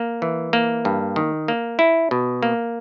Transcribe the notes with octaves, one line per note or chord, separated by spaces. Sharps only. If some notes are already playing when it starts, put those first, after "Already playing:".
Already playing: A#3
E3
A#3
G2
D#3
A#3
E4
B2
A#3